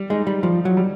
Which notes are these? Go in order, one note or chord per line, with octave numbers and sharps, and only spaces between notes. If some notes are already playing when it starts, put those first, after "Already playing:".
Already playing: G3
G#3 D#4
G3
F3 G3
F#3
G3